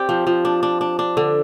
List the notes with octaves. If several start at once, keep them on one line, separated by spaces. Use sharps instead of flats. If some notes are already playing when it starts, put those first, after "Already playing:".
Already playing: C4 G4 D5
F3
F3
D4
D4
D4
D4
D3